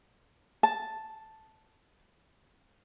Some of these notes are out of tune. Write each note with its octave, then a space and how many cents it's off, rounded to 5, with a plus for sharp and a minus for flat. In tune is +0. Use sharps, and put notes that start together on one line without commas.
A5 +0